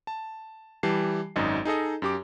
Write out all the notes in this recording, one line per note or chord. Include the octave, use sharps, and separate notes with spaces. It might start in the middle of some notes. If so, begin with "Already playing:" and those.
A5
E3 G3 G4 A5 C7
G#1 F#2 D#4 D#5
D#4 G#4 A4 D#5
F#2 G4 D6